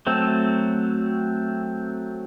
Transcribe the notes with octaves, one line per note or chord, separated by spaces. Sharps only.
F#3 A3 C4